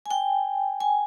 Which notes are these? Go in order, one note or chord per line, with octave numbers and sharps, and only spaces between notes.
G#5
G5
G#5